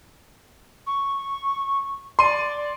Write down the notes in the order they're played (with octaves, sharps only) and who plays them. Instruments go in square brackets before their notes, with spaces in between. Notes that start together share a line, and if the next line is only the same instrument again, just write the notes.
[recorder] C#6
[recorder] D5 [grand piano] C6 D#7